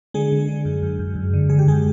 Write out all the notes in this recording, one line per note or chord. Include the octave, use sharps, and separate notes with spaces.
D3 G#3 G#4
D3
D3
F#2
F#2
F#2
F#2
D3
D3 G#4
G4
F#2 G#3 G#4